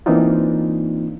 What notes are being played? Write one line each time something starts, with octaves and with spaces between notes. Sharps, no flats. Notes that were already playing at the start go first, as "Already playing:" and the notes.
E3 A#3 C4 D4 D#4 F4